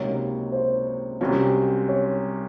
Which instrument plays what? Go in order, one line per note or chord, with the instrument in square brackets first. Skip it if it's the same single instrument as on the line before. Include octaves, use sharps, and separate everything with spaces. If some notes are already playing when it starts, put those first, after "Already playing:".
Already playing: [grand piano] C#2 C3 F#3 A#3 D#4 [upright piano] C#5
[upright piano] C5
[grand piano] C2 C3 F#3 C#4
[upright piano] C#5